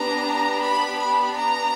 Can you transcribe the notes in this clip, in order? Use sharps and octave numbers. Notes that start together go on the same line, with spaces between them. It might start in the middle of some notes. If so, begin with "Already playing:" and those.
Already playing: B3 D4 G4 A#5
B5
B5
A#5